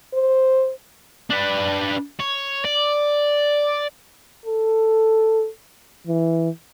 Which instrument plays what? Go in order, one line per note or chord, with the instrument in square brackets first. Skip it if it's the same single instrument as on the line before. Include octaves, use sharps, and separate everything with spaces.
[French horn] C5
[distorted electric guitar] D4 B4
C#5
D5
[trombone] A4
E3